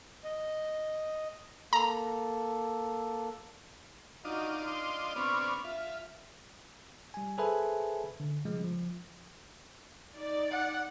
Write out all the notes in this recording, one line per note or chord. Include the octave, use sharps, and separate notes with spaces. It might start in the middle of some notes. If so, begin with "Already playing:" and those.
D#5
A#3 A4 A#5
D4 D#4 F4 F#4 D#5
C6
B3 C4 D4 C#6 F6
F4 E5
G3 G#5
G#4 A4 B4 C5 E5 G#5
D3
C#3 F3 G3 G#3
F3
D#4 D5
F#5